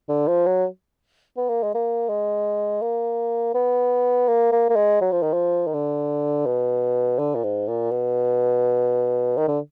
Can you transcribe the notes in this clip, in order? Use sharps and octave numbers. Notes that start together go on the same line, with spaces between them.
D3
F3
F#3
B3
A#3
G#3
A#3
G#3
A#3
B3
A#3
A#3
A#3
G#3
F#3
F3
D#3
F3
D#3
D3
B2
D3
A#2
G#2
A#2
B2
D#3
D3